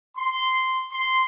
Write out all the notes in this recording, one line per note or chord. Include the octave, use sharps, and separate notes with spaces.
C6
C6